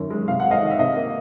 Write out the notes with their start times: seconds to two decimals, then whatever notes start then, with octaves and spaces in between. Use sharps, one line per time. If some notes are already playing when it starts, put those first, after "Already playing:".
Already playing: F#2 D#3
0.10 G#3
0.28 C3 F5
0.40 G#3 F#5
0.51 D#5 F5
0.62 D#3
0.71 E5
0.79 C3 D#5 F5
0.97 A#3